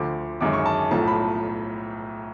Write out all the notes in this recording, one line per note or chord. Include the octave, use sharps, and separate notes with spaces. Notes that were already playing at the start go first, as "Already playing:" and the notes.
Already playing: D2 D3 F3 D6
G#1 F#2 D3 G#3 D6
C#6
A5
B1 A2 F3 A5
B5